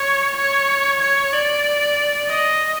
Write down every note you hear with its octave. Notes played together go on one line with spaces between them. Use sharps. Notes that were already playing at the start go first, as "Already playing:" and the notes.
Already playing: C#5
C#5
C#5
D5
D#5